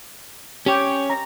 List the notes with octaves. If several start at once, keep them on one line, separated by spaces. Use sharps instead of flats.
C#4 G4 C#5
A#5